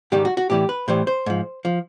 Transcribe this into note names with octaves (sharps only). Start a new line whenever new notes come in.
G#2 D#3 G3 G4
F#4
F#4
A2 E3 G3 G4
B4
A2 E3 G3 C5
C5
G#2 F3
F3